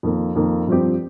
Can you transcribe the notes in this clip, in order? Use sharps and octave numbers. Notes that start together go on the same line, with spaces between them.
F2 D#3 A#3
F2 D#3 A#3
G2 F3 C4 G4